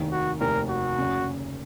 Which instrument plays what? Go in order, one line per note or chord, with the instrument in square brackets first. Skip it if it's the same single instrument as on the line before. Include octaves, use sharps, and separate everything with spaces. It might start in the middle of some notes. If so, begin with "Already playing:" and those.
Already playing: [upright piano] F1 D#2 D#3
[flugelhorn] F#4
[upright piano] F1 D#2 D#3 [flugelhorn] A#4
[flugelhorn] F#4
[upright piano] F#1 F#2 C#3